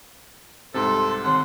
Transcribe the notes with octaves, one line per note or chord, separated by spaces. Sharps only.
C2 G#2 C3 A4 C5 C6
D#3 C4 F#5 C6